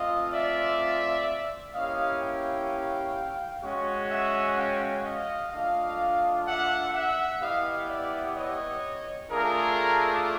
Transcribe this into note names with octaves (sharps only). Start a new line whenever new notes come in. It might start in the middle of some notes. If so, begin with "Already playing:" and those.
Already playing: A3 C4 F4 D#5 F5
D5 E5
A#3 C#4 E4 G4 D#5 F5
F5 G5
G#3 C#4 F#4
E5 F#5
F5 G5
D#5 F5
A3 D4 F4 D#5 F5
E5 F#5
E5 F#5
B3 E4 G4 D#5 F5
D5 E5
C#5 D#5
A3 D4 F4 G#4 A#4